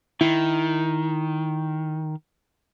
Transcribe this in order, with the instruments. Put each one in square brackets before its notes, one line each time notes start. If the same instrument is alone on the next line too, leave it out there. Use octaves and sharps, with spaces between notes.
[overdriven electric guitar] D#3 [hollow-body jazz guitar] E4